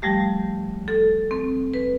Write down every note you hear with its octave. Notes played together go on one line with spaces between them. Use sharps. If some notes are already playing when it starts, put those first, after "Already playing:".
F3 G3 A3 G4
A4
C4
B4